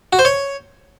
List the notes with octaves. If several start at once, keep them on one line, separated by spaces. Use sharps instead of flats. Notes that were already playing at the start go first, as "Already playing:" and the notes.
F#4
C5
C#5